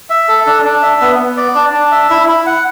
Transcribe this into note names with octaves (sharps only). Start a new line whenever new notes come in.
E5
A4
D4
D4
E5
B3
B3
D5
D4
D4
E5
E4
E4
F#5